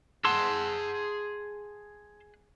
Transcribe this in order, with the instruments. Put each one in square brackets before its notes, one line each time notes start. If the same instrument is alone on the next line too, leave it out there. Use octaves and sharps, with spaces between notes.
[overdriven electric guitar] G#4 F#5 [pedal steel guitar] A5 C6 E6